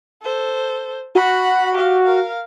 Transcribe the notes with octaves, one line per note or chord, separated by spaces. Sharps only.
A4 C5
F#4 F#5 B5
G4 F5
A#4 F5